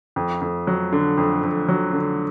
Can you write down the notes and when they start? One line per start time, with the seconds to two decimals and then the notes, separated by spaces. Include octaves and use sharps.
0.16 F2
0.41 F2
0.67 F#3
0.93 D3
1.17 F2
1.43 F2
1.68 F#3
1.93 D3